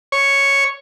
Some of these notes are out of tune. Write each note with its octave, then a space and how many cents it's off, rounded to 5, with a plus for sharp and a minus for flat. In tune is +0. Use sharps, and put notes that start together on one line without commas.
C#5 +0